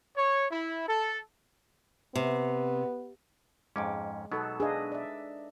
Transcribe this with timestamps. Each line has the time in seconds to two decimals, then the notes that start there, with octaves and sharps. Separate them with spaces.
0.17 C#5
0.51 E4
0.88 A4
2.15 C3 B3
3.76 F2 G#2 G#3 C#4 D6
4.32 B2 F#3 B3 D#4 A4
4.60 D4 G#4 B4 D#5 F5
4.92 D5 E5